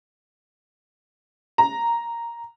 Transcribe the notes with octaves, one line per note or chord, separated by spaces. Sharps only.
A#5